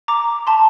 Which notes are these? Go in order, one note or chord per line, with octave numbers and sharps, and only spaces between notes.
A#5 D6
A5 C6